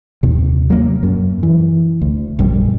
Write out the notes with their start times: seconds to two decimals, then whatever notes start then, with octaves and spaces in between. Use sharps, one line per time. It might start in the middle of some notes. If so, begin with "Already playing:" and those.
0.23 D#2 C3
0.70 F#3 A#3
1.03 F#2
1.43 E3
2.02 D2
2.39 A#1 F#2 G3